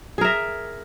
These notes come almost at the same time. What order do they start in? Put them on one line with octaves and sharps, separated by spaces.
G#4 A#4 E5